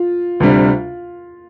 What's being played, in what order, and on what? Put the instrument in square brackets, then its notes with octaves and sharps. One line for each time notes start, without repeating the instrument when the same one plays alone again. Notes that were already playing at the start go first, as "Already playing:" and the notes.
Already playing: [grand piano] F4
[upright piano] D2 C3 G3 D4